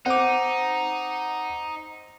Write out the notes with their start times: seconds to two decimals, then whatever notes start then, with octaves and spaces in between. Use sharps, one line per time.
0.06 C4 D#4 F#5 D6